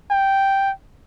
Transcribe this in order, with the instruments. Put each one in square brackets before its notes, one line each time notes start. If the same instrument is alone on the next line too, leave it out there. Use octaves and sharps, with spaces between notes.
[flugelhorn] G5